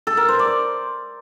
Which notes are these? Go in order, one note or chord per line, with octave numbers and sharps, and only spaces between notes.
A4
A#4
C5
D5